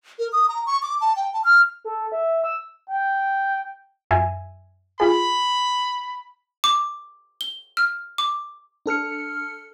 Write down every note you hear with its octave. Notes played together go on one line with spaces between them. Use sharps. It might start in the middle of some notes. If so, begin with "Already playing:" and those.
A#4
D#6
A#5
C#6
D6
A5
G5
A5
F6
A4
E5
E6
G5
F#2 E5 G#5
F4 G#4 B5
D6
G7
F6
D6
D4 A4 F6 C#7